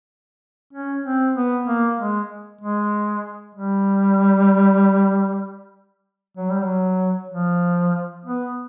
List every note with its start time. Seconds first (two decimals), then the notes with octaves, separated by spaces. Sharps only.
0.73 C#4
1.04 C4
1.36 B3
1.67 A#3
1.99 G#3
2.61 G#3
3.55 G3
6.37 F#3
6.50 G3
6.62 F#3
7.32 F3
8.25 B3